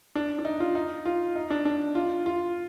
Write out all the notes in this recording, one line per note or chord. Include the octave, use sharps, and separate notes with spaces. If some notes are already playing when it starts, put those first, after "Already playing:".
D4
D4
D#4
F4
D#4
F4
D#4
D4
D4
F4
F4